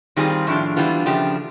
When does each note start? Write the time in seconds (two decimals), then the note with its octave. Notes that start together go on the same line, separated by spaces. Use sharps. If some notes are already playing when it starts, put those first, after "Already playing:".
0.16 D#3 G3 C4 F4 G#4
0.47 A2 F3 A3 D4 F4
0.76 E3 G3 B3 D4 F4
1.06 C#3 F3 A3 D4 G4